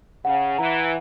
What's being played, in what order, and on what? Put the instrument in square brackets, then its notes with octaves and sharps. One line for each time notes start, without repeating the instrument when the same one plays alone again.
[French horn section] C#3 [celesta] F#5
[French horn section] E3 [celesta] A#5